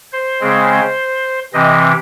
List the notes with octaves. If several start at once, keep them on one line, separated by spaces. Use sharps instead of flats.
C5
C#3 G#3 C4
C3 E3 C4 D#5